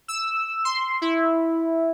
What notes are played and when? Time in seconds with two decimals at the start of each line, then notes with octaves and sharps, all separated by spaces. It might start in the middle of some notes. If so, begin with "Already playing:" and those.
0.08 E6
0.65 C6
1.02 E4